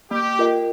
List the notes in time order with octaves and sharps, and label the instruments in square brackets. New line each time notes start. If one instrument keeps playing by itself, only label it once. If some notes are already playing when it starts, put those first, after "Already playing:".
[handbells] A#3 [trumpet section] G4
[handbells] F4 A#4 D#5 G5